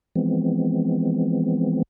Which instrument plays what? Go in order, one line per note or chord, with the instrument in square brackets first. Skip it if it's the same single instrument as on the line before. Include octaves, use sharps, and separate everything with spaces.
[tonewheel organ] E3 F3 G#3 B3 C4